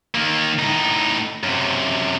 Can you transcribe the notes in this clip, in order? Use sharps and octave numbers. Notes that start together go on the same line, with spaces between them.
D#3 A#3
A2 D#4
F#2 C3